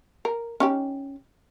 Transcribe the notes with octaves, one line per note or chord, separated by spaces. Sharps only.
A#4
C#4 D#4 G4